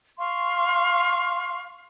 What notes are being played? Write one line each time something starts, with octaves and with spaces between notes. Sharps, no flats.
F5 C6 C#6